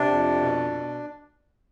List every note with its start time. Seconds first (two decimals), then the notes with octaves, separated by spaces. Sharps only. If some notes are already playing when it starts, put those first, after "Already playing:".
Already playing: C3 D4
0.11 F2
0.41 B2
0.71 B2